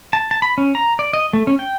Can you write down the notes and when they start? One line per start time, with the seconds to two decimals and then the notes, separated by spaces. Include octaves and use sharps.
0.13 A5
0.31 A5
0.42 B5
0.58 C#4
0.75 A#5
0.99 D5
1.13 D#5
1.33 A3
1.47 C#4
1.59 G5